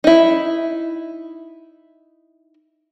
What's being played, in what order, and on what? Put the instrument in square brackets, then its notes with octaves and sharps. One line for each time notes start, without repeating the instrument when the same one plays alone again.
[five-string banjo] D#4 E4